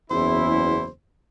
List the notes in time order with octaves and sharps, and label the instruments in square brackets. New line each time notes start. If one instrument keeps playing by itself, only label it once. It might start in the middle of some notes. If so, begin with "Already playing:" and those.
[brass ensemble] F#1 E2 E4 [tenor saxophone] C5